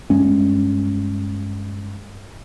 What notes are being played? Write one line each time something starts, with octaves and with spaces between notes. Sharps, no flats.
G2 G#3 C#4